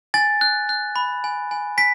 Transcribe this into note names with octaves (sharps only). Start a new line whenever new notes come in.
G#5 A6
F#6
F#6
B5
G#5
G#5
G#5 B6